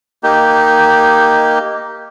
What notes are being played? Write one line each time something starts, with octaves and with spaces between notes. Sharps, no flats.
A#3 D#4 G4